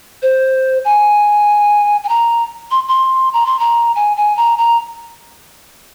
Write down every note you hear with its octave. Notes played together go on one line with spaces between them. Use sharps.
C5
G#5
G#5
A#5
C6
C6
A#5
C6
A#5
G#5
G#5
A#5
A#5